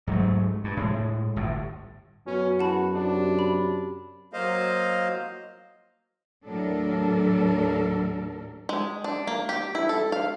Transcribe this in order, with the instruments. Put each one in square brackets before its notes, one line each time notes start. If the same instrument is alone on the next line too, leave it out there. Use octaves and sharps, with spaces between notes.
[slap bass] G#2 F#3 G3 A3
G2
A2 G#3
G1 A2
[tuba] F#2 [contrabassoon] B2 [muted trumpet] C#4
[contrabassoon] E2 [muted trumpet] F#4 [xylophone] F#5 A5 B5
[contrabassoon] C3 [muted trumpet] D4
[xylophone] B5
[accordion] F#3 A#3 C5 D#5 F5
[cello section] D#2 A2 F#3 D4 A4 A#4
[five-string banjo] G#3
D4
A#3
G4
E4
A4
F5